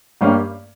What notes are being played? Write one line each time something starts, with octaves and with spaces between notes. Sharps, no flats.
G2 G3 A#3 C#4